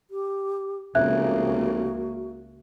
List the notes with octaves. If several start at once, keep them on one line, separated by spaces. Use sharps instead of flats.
G4
F1 C#2 C#3 A#3 F#4 E5 F#6 G#6